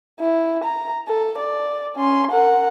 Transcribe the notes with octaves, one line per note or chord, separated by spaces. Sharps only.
E4
A#5
A4
D5
C#4 C6
A#4 F#5